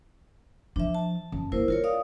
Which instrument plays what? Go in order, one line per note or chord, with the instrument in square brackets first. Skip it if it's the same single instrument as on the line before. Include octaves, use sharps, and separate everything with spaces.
[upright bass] F3 [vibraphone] D4 E5
[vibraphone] A5
[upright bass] F#2
[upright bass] A#3 [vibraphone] E4 A#4 C5
[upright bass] D4 [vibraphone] F4 A#4 C#5
[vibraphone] D5 F5 D#6